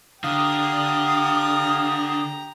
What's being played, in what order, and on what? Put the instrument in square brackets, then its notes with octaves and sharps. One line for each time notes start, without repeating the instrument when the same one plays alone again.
[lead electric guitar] D3 [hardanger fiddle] G4 A#5 [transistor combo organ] F5 [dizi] D#6